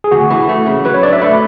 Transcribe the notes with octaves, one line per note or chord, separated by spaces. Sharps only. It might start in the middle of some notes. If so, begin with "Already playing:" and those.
G#4
D2 F#4
E3
A3
C#3
F#3 B4
C#5
D4 D5
E5
A3 B5